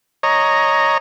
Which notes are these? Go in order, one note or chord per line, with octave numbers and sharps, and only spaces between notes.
C#5 D#5 A#5